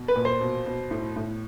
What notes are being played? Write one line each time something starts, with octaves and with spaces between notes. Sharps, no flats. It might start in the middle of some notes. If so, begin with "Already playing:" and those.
Already playing: B2
B4
A#2
C5
B2
B2
A2
A2